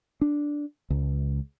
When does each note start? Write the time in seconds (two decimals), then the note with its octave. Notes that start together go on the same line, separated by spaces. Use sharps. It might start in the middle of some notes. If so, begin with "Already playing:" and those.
0.21 D4
0.90 C#2